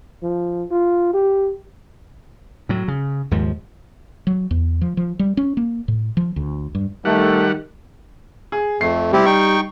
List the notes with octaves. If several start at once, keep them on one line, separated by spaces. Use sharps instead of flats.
F3
F4
G4
A2 F#3
C#3
D#2 G#2 F3
F#3
E2
F3
F3
G3
C#4
A#3
A2
F3
D2
G2
D#3 G3 A3 F#5
G#4
F2 A3 C7
G3 C4 E4 G4
D#4 G5 C#6